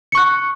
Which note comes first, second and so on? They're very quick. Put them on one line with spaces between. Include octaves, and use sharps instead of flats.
C#7 C#6 F#6